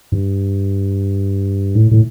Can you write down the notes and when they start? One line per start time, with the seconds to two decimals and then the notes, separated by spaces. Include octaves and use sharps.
0.12 G2
1.75 A2
1.91 A2